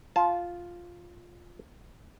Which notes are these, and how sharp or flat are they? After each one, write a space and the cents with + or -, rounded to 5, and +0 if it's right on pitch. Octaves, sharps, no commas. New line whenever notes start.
F4 +0 A5 -25